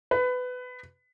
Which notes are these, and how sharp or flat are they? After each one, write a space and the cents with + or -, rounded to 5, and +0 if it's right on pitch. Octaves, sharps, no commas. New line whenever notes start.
B4 +20